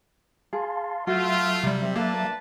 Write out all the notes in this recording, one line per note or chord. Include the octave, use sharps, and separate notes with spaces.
G#4 F5 A5 C6
F#3 A3 F4 F#4 E5
C3 G3
A#3 D4 A4 B4 A5